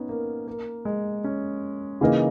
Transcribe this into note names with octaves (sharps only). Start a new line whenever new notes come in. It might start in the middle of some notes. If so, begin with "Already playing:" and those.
Already playing: B3 C#4 D#4
A#3
A#3
G#3
C#4
C#3 E3 A#3 D#4 A#4